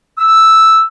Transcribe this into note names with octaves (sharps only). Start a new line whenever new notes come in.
E6